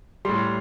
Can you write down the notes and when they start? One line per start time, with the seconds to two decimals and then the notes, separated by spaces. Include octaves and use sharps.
0.25 A2 G3 C6